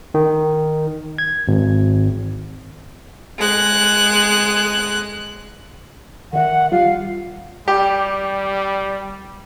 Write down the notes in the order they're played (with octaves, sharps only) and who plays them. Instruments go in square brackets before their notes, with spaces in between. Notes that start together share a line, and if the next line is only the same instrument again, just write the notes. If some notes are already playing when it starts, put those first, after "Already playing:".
[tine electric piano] D#3
G#6
G#1
[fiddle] G#3 F#6
[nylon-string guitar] D#3 E5 [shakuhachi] F#5
[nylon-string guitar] G3 F4 [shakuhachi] F5
[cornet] G3 [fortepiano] G4